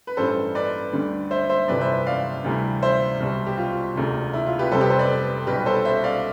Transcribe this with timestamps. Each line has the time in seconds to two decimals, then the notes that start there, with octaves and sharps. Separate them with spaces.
0.07 B4
0.17 A1 G2 E3 G3 A4 C5
0.55 B4 D5
0.93 D2 D3 G3
1.31 C5 E5
1.49 C5 E5
1.68 G1 F2 C3 E3 G3 B4 D5
1.81 C5 E5
2.06 D5 F5
2.44 D2 C3 E3 G3
2.82 C5 E5
3.20 C2 B2 G3
3.47 G4
3.58 F4
3.95 E1 D2 C3
4.34 E4
4.46 F4
4.59 G4 B4
4.71 F1 F2 C3 G3 A4 C5
4.81 G4 B4
4.90 A4 C5
4.99 B4 D5
5.47 B1 B2 G3 G4 B4
5.66 A4 C5
5.85 C5 E5
6.04 D5 F5